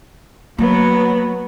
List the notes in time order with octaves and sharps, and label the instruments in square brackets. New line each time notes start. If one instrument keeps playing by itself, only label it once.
[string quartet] F#3 B3 [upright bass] A#3